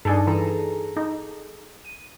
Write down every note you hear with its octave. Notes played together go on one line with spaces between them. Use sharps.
G2 D4 D#4 G#4 A4
E3 G#4 A4 A#5
D#4
D#7